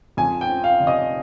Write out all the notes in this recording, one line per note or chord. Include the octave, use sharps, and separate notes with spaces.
F2 G#5
G5
F3
F5
F1
D#5